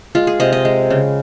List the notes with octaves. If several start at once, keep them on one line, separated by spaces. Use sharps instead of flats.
G#3 F4
G#4
C3 D#5
D#5
G#3
C#3